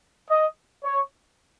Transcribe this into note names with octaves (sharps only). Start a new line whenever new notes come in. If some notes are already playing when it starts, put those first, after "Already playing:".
D#5
C#5